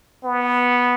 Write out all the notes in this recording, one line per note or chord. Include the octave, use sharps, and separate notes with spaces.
B3